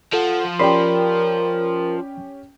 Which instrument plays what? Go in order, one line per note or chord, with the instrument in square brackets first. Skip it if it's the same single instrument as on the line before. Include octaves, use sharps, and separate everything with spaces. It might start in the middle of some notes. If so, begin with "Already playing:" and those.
[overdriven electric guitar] F3 [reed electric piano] A4 [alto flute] F#5
[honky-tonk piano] C#4 G4 G5 [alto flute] A#4 [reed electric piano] D5 B5 C6